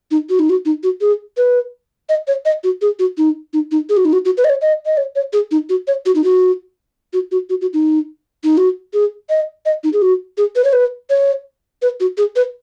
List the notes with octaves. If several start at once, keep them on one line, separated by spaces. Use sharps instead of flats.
D#4
F#4
D#4
F#4
D#4
F#4
G#4
B4
D#5
C#5
D#5
F#4
G#4
F#4
D#4
D#4
D#4
G#4
F#4
D#4
F#4
F#4
B4
D#5
C#5
D#5
D#5
C#5
C#5
G#4
D#4
F#4
C#5
F#4
D#4
F#4
F#4
F#4
F#4
F#4
D#4
D#4
F#4
G#4
D#5
D#5
D#4
G#4
F#4
G#4
B4
C#5
B4
C#5
B4
F#4
G#4
B4